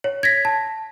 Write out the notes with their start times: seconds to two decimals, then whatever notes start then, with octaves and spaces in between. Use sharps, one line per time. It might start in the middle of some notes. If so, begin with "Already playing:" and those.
0.04 C#5
0.23 G#6 A#6 B6
0.45 A5